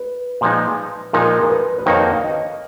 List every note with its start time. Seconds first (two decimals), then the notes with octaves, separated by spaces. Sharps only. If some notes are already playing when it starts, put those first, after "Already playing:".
Already playing: B4
0.41 A#2 F3 G#3 D#4
1.13 A#2 F3 G#3 D#4 A#4
1.42 A#4
1.50 B4
1.78 B4
1.86 F2 D#3 A#3 D#4 F#4 C#5
2.13 F5
2.23 D#5